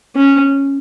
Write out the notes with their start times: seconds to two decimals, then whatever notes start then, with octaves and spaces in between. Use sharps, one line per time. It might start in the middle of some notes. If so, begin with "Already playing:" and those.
0.16 C#4